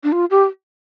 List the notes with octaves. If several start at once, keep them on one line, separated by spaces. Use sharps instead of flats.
D4
F4
G4